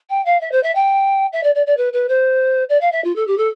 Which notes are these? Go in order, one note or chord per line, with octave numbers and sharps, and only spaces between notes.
G5
F5
E5
C5
E5
G5
E5
D5
D5
D5
B4
B4
C5
D5
F5
E5
F4
A4
G4
A4